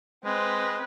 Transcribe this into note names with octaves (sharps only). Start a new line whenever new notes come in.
G#3 C4 B4